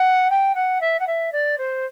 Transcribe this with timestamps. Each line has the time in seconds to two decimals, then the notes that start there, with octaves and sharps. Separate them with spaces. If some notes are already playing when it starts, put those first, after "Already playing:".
Already playing: F#5
0.30 G5
0.55 F#5
0.81 E5
0.99 F#5
1.07 E5
1.32 D5
1.58 C5